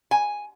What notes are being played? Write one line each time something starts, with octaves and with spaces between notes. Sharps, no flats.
G#5